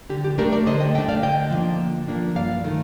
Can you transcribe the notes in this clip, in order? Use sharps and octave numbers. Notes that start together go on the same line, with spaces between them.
D3 G4
G4
A3 D4 G4 A#4
A#4 D5
D3 C5 D#5
D#5 G5
A3 D4 D#5 G5
D5 F5
D3 D#5 G5
F3 A#3 D4
D3
F3 A#3 D4
G2 D5 F5
D#3 A3